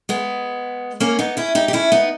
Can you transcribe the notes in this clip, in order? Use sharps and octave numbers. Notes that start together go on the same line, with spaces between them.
G#3 B3
A#3 C#4
B3 D#4
C#4 E4
D#4 G4
G4
C#4 E4
B3 D#4